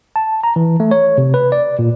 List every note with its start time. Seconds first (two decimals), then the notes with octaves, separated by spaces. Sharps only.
0.16 A5
0.44 A#5
0.56 E3
0.80 A3
0.91 C#5
1.18 C3
1.34 B4
1.52 D5
1.79 A#2